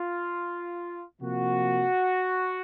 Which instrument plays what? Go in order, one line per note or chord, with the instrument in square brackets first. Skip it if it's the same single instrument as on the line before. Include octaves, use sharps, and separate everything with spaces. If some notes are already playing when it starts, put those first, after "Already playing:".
Already playing: [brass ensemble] F4
C3 F3 A#3 F#4